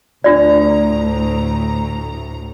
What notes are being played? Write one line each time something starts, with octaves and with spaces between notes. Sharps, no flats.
D2 A2 D4 F4 D5 A#5